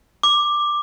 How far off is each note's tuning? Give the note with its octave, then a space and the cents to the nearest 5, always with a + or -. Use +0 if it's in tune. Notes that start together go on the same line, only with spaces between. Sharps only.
D6 +10